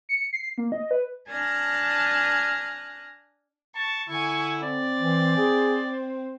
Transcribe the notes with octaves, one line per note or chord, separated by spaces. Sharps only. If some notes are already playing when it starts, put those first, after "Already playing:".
C#7
C7
A#3
D#5
B4
D4 G#5 A5 F6 F#6 A#6
A5 C#6
D3 E4 G#5 C#6
C4 D5
E3
G#4
C5